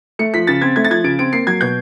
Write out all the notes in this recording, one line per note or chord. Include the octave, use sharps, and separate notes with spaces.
A3 C#7
F3 B6
C#3 A6
C4 G#6
A3 G#6
A6
F3 G#6
C#3 D7
C4 D7
A#3 C7
F#3 G#6
B2 G6